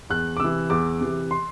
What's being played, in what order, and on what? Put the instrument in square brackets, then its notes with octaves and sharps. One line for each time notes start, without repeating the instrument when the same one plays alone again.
[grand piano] E2 F#6
D6
C3 E3 E6
E2 D6
C3 E3
C6